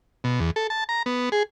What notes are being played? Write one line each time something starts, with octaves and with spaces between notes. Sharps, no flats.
B2
E2
A4
A5
A#5
B3
G#4